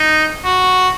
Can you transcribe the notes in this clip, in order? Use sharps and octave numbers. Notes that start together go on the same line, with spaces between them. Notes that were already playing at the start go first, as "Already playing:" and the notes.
Already playing: D#4
F#4